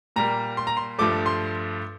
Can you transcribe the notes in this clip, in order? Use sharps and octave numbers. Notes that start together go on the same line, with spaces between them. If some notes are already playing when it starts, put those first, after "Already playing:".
A#2 G3 A#3 A#5
C6
A#5
C6
G2 F3 A3 D6
C6